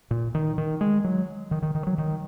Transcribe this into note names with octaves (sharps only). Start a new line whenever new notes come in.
A#2
D#3
D#3
G#3
F#3
D#3
D#3
D#3
F#3
D#3